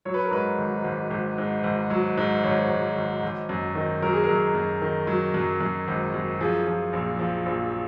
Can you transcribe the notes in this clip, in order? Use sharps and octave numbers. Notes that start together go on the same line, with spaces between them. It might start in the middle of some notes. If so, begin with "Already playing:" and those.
F#3 C#5
B4
A#4
G#2 B4
G#1
G#1
G#1
G#2
G#1
F#3
G#2
G#1 C#5
G#1
G#1
G#1
F#2
D#3
F#3 A#4
G#4
A#4
F#2
F#2
D#3
F#3
F#2
F#2
G#1
F#2
F3 G#4
F3
A#1
F3
A#1